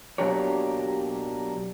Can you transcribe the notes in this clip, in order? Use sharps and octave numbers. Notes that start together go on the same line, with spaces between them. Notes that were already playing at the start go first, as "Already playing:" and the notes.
B2 F#3 A#3 D4 G4 C#5